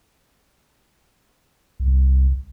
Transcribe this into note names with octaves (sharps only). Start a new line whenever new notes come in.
C2